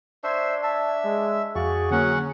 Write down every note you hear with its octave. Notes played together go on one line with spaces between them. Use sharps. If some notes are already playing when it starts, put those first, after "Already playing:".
D4 C5 E5 C#6 G#6
E5 A5
G#3
F2 F#4 G#4 D5 F5 C#6
D3 F#3 A#3 C#4 F#5